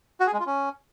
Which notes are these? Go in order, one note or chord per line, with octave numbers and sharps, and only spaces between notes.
F#4
G#4
G#3
F4
C#4